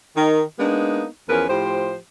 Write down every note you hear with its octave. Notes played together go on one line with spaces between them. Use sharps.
D#3
G#3 A#3 B3 D4 D#4
E2 F3 C#4 A#4 B4
A2 F3 G4 C5